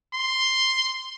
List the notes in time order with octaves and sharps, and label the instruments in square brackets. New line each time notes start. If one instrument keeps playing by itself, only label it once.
[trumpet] C6